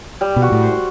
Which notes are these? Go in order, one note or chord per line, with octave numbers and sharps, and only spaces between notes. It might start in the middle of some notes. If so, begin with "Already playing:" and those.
G3
B2
F#4
A2
C5